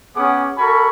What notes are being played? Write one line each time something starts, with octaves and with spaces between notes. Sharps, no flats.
B3 C#4 G#4 F#5 D6
F#4 A4 A#4 G#5 B5 C#6